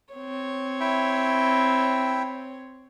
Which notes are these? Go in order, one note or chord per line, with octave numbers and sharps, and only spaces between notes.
C4 C#5
E4 E5 G5